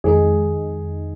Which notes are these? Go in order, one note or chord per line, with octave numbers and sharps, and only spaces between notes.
F2 D#3 G#3 D#4 G#4